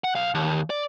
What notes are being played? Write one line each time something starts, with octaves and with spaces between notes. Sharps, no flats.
F#5
B1 F5
D#2
D5